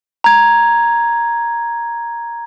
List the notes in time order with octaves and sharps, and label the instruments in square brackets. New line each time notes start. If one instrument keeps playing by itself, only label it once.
[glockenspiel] A#5 G#6